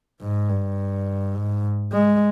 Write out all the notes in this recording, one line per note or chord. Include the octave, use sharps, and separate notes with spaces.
G#2
G2
G#2
G#3